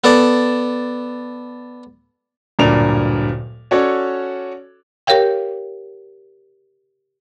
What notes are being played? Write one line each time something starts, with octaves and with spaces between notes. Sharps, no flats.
B3 A4 D5 A5
D1 G2 A#2 A#4 D5 F7
C#4 F#4 A4 C#5 D5
G4 A#4 C#5 F5 G5